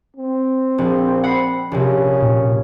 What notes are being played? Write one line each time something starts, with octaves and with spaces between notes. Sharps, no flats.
C4
A#1
F#5 B5 C7
A#1 C3 C#4
A#2